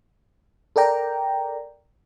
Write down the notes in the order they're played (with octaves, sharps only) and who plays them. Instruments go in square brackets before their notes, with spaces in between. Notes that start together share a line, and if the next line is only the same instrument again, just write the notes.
[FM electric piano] A4 A#4 D5 G5 A#5